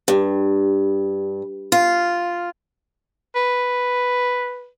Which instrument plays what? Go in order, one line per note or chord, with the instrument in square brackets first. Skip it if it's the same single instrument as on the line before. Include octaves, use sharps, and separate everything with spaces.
[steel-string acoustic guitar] G2
F4
[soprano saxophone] B4